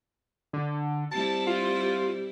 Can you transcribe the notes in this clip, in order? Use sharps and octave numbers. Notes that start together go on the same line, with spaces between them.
D3
G3 C4 E4 A5
F4